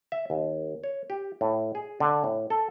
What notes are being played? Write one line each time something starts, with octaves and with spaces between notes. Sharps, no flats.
E5
D#2
C#5
G4
A2
G#4
D3
A2
A4